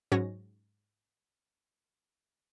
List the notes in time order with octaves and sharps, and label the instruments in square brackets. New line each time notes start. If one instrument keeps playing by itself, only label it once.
[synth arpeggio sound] G#2 F#3 C#4 F#4 C#5 A#6